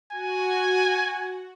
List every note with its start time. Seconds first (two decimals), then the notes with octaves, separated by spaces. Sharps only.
0.12 F#4 G#5